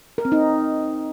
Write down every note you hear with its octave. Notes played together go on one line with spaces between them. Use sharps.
A#4
C4
D#4